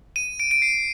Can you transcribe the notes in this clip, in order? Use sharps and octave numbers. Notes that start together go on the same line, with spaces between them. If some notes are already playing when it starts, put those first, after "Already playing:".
D#7
D7
D7
C7